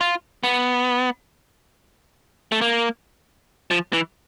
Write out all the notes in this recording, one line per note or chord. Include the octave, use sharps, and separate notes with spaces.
F4
B3
A3
A#3
F3
E3